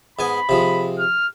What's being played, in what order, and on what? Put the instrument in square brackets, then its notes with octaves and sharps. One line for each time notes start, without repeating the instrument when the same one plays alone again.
[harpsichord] G#2 B3 G#5 [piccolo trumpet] B5
[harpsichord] C3 F3 G#3
[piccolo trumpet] F6